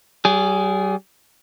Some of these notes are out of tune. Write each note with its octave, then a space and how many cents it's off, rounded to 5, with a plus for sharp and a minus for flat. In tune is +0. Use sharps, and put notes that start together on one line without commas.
G3 -40 G#4 +0